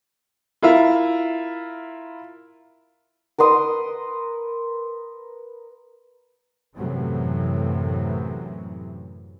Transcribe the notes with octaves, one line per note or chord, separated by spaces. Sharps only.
E4 F4 A#4 E5
A#4 B4 C6 D#6
F#2 A2 C3 E3 F#3